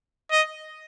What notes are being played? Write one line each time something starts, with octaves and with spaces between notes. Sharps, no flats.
D#5